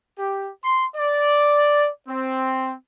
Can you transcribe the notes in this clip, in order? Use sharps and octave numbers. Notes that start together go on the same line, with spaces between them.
G4
C6
D5
C4